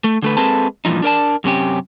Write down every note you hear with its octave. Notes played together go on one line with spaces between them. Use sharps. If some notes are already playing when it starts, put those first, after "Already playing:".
A3
D3 A3 B4
G#3 A#3 C4 A4 B4 A5
G2 A#2 E3 F3 D#4
D4 A#4 D5 A5
F#2 C3 C#4 G4